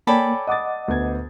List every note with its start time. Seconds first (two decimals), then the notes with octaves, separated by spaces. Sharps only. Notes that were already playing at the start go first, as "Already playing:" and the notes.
0.07 A#3 A4 C#5 D5 G5 G#5 B5
0.47 D#5 F#5 D6 D#6 A6
0.88 D2 B3 G#6